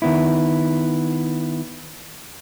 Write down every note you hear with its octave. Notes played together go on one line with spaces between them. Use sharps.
D#3 B3 E4